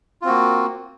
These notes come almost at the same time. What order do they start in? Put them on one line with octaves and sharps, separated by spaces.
F4 C4 F#4 A#3